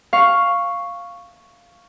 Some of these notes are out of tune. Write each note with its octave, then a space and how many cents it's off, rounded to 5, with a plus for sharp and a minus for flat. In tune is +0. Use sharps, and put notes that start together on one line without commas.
F5 +0 C#6 +0